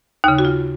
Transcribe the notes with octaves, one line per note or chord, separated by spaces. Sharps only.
D#2 C#3 D#4
F#4
F4